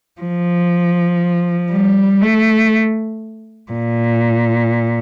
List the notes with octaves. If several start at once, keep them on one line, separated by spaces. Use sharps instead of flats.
F3
G3
A3
A#2